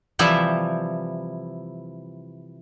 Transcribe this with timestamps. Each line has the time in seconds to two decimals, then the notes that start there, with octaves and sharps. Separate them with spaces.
0.19 C3 E3 F3 G3 E4 E5